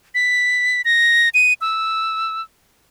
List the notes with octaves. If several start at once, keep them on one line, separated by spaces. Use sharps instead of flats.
B6
A#6
D#7
E6